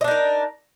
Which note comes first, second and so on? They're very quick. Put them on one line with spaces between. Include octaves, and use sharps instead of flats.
D#5 D4 D#4 A#4